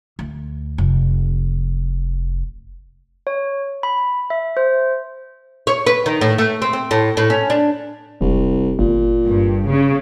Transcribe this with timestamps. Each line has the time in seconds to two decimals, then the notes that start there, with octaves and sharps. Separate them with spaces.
0.19 D2
0.78 F1
3.27 C#5
3.83 B5
4.30 E5
4.57 C5
5.67 C#5
5.86 B4
6.06 D#3
6.21 A2
6.38 A3
6.62 C4
6.73 C4
6.91 A2
7.17 A2
7.30 C#4
7.50 D4
8.21 E1 C2
8.79 G1 A#2
9.25 G2
9.68 C#3